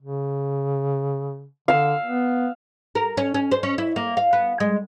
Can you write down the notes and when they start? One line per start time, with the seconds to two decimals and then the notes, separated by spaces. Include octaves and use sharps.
0.01 C#3
1.68 D3 F5 E6
2.05 B3
2.95 A#4
3.17 C#4
3.34 C#4
3.51 C5
3.63 C#4
3.78 E4
3.96 A#3
4.17 F5
4.33 B3
4.60 G#3